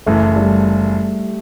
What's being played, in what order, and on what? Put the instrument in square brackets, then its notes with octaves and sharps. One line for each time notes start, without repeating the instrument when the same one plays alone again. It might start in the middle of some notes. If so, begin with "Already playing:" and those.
[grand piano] F#1 F#2 E3 [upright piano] A3
[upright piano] G3